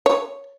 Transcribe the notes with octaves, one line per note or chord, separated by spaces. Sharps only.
C#5